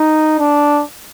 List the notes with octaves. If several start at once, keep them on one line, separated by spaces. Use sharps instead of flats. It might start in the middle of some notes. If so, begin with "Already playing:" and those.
Already playing: D#4
D4